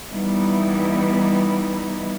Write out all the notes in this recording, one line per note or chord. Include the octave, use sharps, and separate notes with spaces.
E3 G3 B3 D#4 E4